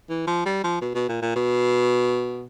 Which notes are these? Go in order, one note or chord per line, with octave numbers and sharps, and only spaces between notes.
E3
F3
G3
F3
B2
B2
A#2
A#2
B2